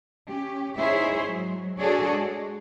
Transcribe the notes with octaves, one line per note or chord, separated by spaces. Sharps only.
C#4 G4
D#4 E4 G#4 C5 C#5 E5
G#2 F#3
D4 F#4 G#4 A4 C#5 D5
G#3